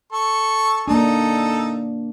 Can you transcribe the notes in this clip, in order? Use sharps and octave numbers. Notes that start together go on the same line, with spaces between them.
A4 C#6
A#3 D4 D#4 A4